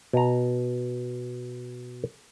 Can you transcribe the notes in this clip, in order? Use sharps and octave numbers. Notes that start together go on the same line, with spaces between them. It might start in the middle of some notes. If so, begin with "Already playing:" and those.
B2 A#5